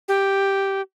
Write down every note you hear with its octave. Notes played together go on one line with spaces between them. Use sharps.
G4